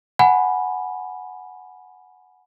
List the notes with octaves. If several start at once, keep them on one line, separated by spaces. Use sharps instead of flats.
F#5 G#5 B5